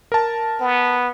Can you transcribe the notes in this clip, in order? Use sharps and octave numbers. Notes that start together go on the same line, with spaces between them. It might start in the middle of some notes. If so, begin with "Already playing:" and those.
A#4 A5
B3